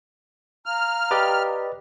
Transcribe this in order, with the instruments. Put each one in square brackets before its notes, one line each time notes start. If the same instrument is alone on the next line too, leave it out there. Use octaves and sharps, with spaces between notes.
[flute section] F5 A#5 [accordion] F6
[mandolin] G4 [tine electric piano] B4 D5 D#5